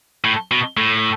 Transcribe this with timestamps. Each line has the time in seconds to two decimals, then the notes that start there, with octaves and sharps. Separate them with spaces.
0.24 A2
0.51 B2
0.77 A2